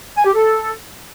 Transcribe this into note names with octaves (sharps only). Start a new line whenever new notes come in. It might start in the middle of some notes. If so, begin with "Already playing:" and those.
G#5
G4
A4